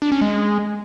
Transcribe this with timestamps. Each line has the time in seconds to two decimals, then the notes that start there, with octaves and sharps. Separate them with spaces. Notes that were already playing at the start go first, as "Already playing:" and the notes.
0.02 D4
0.12 C#4
0.21 G#3